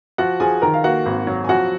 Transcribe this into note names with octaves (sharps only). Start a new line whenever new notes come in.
F3 F#4 F#5
F3 G#4 G#5
D#3 A#4 A#5
F5
A#3 F#4 F#5
G#1
F#3
G#5
F3 F#4 F#5